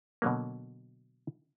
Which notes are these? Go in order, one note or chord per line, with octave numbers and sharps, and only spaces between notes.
B2 D3 F#3 A#3